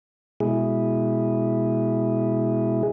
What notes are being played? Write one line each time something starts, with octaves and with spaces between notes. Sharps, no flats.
B2 G#3 E4 G#4